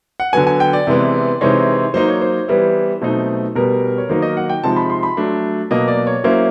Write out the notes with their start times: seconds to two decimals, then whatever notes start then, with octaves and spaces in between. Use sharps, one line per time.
0.20 F#5
0.33 D3 F#3 B3 G#5
0.47 G#5
0.60 G5
0.73 D5
0.87 C3 E3 G#3 B3
1.41 C3 E3 G#3 C4 D#4 C#5
1.94 F#3 A#3 D#4 C5
2.08 C#5
2.22 C5
2.48 E3 G3 B3 E4
3.01 B2 F#3 A3 C4 D#4
3.55 B2 G3 B3 A#4
3.98 C#5
4.09 D#3 F#3 A#3 D#4 C5
4.22 D#5
4.37 F#5
4.49 G5
4.63 C3 F3 G#3 C4 D#4 A5
4.76 B5
4.90 C6
5.03 B5
5.17 F#3 A3 D4
5.71 B2 F#3 A#3 D#5
5.88 D5
6.07 C#5
6.24 F#3 A#3 C#4 E4 C5